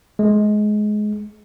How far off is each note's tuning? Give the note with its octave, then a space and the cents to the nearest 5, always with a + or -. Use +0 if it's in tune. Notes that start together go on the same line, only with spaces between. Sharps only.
G#3 +20